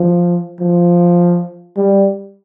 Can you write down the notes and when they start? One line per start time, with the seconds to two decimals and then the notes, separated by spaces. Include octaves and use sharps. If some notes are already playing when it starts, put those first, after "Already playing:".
Already playing: F3
0.61 F3
1.77 G3